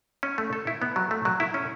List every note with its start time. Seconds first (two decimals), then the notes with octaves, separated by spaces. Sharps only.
0.23 C#4
0.38 A3
0.53 A4
0.67 E4
0.82 B3
0.96 F#3
1.11 A3
1.25 F#3
1.40 E4
1.54 C#4